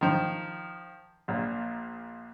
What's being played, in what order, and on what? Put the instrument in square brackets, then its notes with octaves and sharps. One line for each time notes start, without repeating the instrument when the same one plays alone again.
[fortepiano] D#3 F3
A#1 A#2